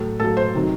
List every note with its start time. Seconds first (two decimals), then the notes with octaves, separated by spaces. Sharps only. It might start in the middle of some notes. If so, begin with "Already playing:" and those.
Already playing: A2 F#3 A4
0.20 A2 F#3 A4
0.37 C5
0.55 C3 D#3 F#3